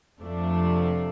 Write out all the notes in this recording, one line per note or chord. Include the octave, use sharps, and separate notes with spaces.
F2 C3 F3 A3 D4